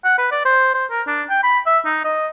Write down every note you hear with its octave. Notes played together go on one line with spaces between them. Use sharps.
F#5
B4
D5
C5
C5
A#4
D4
G5
B5
E5
D#4
D#5